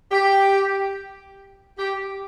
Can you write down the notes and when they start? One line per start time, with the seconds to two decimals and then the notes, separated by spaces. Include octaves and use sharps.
0.11 G4
1.79 G4